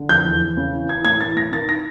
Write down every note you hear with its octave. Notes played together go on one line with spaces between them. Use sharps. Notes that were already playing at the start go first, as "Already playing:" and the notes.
Already playing: D3
F2 G6
E2
E2
C#3
E3
E3 G#6
A2 G#6
E3 A6
A2 A#6
D#3 A6
A#6